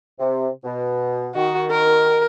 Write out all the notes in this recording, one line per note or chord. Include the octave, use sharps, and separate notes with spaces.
C3
B2
D#3 F#4
A#4